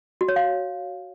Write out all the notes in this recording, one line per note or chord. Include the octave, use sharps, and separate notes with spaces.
F#4
C#5
F5